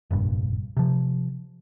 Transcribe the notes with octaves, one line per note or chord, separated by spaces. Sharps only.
F1 A#1 G2
C3 F3